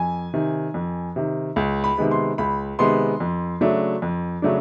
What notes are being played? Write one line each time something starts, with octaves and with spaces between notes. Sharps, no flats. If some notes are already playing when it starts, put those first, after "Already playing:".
Already playing: F2 G#5
C3 D#3
F2
C3 D#3
C#2
B5
C3 D#3 G#3 B3
C6
C#2 B5
C3 D#3 G#3 B3 C6
F2
C#3 F#3 A3 D4
F2
C#3 F#3 A3 D4